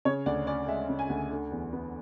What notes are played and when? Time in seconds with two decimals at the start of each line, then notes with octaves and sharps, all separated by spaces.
0.05 C#3 C#5
0.26 D2 D5
0.47 C#4 D5
0.68 G#3 E5
0.89 C#3
0.99 G#5
1.10 D2
1.31 D3
1.52 E2
1.73 B3